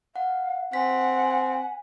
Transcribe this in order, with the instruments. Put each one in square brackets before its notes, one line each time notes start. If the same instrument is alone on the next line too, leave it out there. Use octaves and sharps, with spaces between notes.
[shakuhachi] F5 [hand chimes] F#5
[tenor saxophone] C4 [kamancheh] F#5 [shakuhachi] G#5 [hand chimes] B6